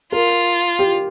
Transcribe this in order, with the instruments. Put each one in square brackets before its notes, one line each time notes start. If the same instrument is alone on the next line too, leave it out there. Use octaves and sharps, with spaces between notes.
[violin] F4 [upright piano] A#4
[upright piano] G4